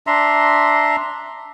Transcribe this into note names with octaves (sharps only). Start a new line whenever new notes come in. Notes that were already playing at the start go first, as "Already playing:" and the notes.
D4 E5 A#5 C6